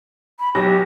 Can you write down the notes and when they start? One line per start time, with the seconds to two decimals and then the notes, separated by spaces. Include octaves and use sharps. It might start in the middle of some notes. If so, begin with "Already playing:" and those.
0.39 B5
0.55 B1 F#3 G4 A#6